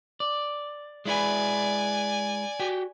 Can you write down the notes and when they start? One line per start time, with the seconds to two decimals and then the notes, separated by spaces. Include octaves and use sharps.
0.20 D5
1.05 G#3 E4 B4 D5 G#5
2.60 F#4 G4 G5